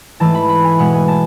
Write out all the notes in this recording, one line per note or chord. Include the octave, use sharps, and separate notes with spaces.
G#2 E3 A3 A5
B5
B5
G#5
B2 G#3 B3 F#5
G#5
A5